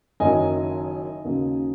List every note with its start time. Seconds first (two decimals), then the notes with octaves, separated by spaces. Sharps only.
0.20 F#1 F#2 D#3 F#3 D#5 G#5
1.24 D#2 C#3 F#3